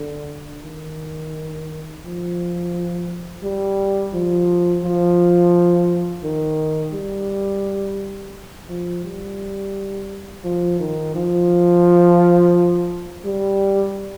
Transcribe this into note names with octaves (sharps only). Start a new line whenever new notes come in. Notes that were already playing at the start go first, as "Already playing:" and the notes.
Already playing: D3
D#3
F3
G3
F3
F3
D#3
G3
F3
G3
F3
D#3
F3
G3